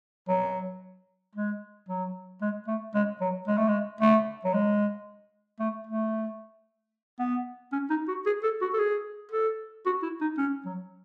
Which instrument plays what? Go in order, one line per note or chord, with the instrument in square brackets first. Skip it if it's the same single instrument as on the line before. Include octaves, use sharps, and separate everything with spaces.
[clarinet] F#3
G#3
F#3
G#3
A3
G#3
F#3
G#3
A3
G#3
A3
F#3
G#3
A3
A3
B3
C#4
D#4
F#4
G#4
A4
F#4
A4
G#4
A4
F#4
E4
D#4
C#4
F#3